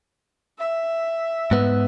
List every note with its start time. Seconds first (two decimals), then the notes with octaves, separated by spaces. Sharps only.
0.58 E5
1.51 G#2 B3